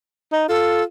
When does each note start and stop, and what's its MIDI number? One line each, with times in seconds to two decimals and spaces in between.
0.33 0.45 63
0.49 0.84 65
0.49 0.82 69